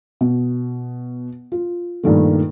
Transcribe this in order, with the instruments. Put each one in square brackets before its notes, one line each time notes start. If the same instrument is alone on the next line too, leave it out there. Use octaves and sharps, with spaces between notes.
[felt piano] B2
F4
G2 A#2 D#3 F3 A3